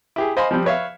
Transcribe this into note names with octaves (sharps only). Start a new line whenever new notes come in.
E4 G4 G#4
C5 D#5 F5 G#5 B5 C6
F3 G3 C4
B4 C#5 E5 F5